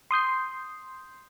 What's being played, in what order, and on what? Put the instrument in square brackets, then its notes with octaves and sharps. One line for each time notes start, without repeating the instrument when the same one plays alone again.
[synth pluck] C6 D#6 G6 C7